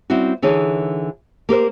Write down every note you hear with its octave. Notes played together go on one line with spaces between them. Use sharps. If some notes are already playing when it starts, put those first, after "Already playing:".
G3 C4 C#4 E4 F#4
D3 E3 D#4 G#4 C#5
A#3 G4 A#4 C5